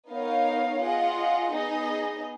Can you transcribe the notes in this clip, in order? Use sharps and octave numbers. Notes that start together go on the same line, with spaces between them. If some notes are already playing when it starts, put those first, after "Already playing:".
B3 D#4 A#4 C#5 F5
F4 G#4 D#5 F#5
B3 D#4 G#4 D#5